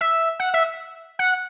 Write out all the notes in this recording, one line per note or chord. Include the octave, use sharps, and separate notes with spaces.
E5
F#5
E5
F#5